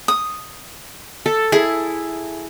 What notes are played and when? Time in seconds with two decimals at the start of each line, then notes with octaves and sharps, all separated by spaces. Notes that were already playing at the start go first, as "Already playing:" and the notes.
0.08 D#6
1.26 A4
1.52 E4 G#4